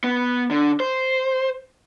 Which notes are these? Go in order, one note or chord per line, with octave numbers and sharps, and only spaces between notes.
B3
D3
C5